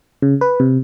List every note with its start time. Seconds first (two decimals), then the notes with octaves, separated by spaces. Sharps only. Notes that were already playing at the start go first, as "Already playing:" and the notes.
0.22 C#3
0.41 B4
0.60 C3